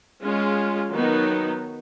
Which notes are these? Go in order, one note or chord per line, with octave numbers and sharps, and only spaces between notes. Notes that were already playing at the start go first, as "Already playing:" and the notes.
G#3 C#4 F4
D#3 F#3 B3 D#4